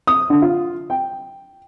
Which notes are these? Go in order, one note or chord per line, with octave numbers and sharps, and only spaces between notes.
D#6
D3
F4
G5